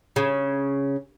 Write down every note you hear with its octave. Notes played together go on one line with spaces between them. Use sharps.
C#3